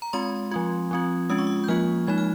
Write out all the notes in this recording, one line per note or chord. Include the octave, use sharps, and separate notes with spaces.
A#5
G#3 C4 F4 C6
F3 C4 F4
F3 C4 F4
G#3 C#4 F4 D#6
C#6
D#6
G6
F3 A#3 F4 F6
F3 G#3 D#4 G#6
F6